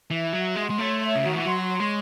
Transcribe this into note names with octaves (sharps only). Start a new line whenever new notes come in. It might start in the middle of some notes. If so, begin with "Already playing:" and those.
E3 E5
F#3 F#4
G#3 C6
G#3
A3 C#5
E5
C#3
D#3 F#4
E3
F#3 C6
C#5
G#3